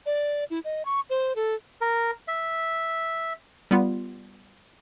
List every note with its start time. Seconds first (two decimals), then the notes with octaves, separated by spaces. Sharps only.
0.06 D5
0.50 E4
0.64 D#5
0.85 C#6
1.10 C5
1.36 A4
1.81 A#4
2.28 E5
3.71 G3 B3 F4